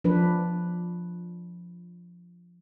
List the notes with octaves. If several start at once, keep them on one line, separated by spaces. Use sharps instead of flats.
F3 D4 B4